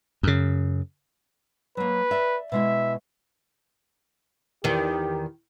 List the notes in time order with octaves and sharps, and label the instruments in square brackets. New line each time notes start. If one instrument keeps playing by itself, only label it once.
[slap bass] F#2 C#3
[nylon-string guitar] F#3 A#3 [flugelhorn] B4
[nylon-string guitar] D5 E5
[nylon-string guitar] B2 G#3 E4 [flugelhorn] E5
[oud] E2 D#3 [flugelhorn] G4